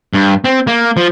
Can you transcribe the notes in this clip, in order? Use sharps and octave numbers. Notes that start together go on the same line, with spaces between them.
G2
C4
A#3
F3